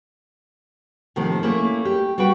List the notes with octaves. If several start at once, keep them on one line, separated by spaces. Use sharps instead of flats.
D#2 A2 C3 D#3 F3
A3 A#3 C#4 E4
G4
G3 F#4 B4 G5